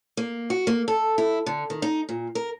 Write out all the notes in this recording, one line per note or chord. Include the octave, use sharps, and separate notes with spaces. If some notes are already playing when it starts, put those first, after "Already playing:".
A#3
F#4
A#3
A4
E4
D3
D#3
D#4
A#2
A#4